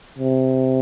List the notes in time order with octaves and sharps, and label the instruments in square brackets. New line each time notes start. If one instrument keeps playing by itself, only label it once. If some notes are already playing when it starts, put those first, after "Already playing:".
[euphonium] C3